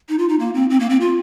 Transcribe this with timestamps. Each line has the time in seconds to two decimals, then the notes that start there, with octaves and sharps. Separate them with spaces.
0.09 D#4
0.19 F4
0.29 D#4
0.40 A#3
0.54 C4
0.70 C4
0.80 A#3
0.90 C4
1.01 F4